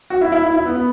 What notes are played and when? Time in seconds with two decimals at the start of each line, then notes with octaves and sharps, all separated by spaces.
0.10 F#4
0.21 E4
0.32 E4
0.43 E4
0.54 E4
0.65 B3
0.75 B3